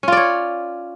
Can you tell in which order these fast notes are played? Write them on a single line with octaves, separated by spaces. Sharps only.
C#4 F4 D5 C#5